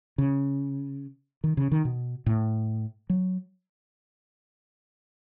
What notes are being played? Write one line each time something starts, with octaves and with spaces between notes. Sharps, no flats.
C#3
D#3
C#3
D#3
B2
A2
F#3